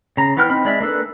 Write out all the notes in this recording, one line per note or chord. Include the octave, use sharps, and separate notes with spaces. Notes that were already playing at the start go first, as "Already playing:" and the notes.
C#3 A#5
E3 B3 B4 G5 F6
C4 D#4 B5
G#3 D5 E5
A#3 D4 A4 B4